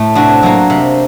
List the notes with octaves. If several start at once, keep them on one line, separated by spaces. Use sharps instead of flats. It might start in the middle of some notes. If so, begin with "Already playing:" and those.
Already playing: A2 A3
C3 D4 F#4
F#3 A#3
C3